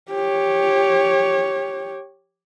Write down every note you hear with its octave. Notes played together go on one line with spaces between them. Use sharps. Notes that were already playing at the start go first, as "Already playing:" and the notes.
G4 C#5